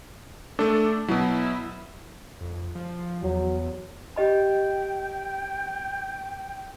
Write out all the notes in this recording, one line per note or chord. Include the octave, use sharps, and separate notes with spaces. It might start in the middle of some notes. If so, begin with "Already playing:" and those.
A3 D4 A4
B2 F#3 E4
F2
F3
E2 F#3
G4 D#5 G5 B5